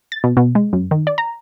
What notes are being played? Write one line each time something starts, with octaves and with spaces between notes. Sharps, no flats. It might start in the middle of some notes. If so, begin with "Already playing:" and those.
A6
B2
B2
G#3
F#2
D#3
D5
A#5